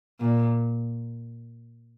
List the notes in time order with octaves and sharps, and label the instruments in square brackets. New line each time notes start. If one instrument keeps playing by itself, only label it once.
[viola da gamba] A#2